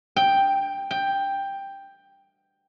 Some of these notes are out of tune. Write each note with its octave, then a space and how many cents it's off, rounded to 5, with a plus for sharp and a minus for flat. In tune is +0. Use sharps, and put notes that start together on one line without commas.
G5 +5
G5 +10